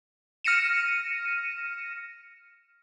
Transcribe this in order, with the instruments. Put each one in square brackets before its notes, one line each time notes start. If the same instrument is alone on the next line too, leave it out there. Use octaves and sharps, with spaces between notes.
[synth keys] F6 A#6 C#7 D#7 E7